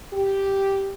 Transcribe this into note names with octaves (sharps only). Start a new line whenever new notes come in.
G4